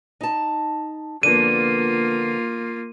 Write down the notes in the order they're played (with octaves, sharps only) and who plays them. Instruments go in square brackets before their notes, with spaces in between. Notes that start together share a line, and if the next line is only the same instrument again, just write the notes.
[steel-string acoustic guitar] D#4 A5
[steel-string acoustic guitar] D3 F3 B3 [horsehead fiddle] A#3 F4 [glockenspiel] D#7